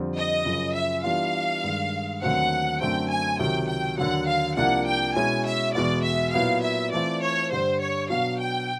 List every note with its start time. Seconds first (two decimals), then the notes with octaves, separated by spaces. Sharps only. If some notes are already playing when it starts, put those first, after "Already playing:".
Already playing: F2 D3 G3 C4
0.16 D#5
0.45 F#2 C#3 F3
0.74 E5
1.04 E3 G3 B3 D4 F4 F5
1.63 G2 D#3 G#3
2.22 D#2 D3 F#3 A3 C4 F#5
2.81 F#2 D3 F#3 A3 C4 G5
3.10 G#5
3.39 C#2 C3 D#3 F#3 G5
3.68 G5
3.98 D#2 D3 F#3 F#5
4.28 F5
4.57 C2 C3 F3 A#3 D4 F#5
4.87 G5
5.15 B2 G#3 C#4 E4 G#5
5.46 E5
5.74 E2 B2 G#3 B3 D5
6.03 E5
6.33 A#2 F#3 B3 E4 F5
6.62 E5
6.92 E3 A3 C4 F4 D5
7.22 C#5
7.51 G2 D3 G3 C5
7.81 C#5
8.10 B2 F#3 B3 D4 F#4 F5
8.39 G5